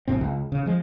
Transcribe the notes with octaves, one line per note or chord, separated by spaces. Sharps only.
A1 F#2 C3 C4
C#2
C#3
F3 G#3